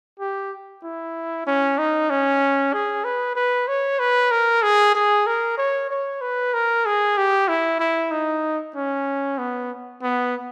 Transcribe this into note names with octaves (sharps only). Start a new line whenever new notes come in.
G4
E4
C#4
D#4
C#4
G#4
B4
B4
C#5
B4
A#4
G#4
G#4
A#4
C#5
C#5
B4
A#4
G#4
G4
E4
E4
D#4
C#4
B3
B3